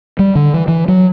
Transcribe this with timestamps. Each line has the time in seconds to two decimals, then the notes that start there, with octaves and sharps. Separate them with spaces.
0.19 G3
0.35 D3
0.54 E3
0.68 E3
0.88 F#3